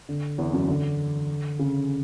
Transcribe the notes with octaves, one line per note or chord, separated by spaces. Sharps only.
D3
E2 E3
F#2 F#3
D3
C#3